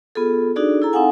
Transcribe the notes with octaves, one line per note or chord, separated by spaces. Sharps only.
B3 F4 G#4 A4
D4 D#4 F#4 G#4 A4 D5
E4 G#4 A4 A#5
C4 D#4 A4 F5 F#5 G#5